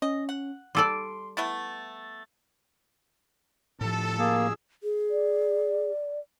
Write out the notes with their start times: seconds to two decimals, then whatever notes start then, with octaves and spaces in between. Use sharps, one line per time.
0.02 C#4 D#5
0.29 F#5
0.75 G3 A4 D5 C6
1.37 A3 B3 E4 A6
3.81 A2 F3 A4
4.19 A#3 G#4 E6
4.83 G#4
5.10 D5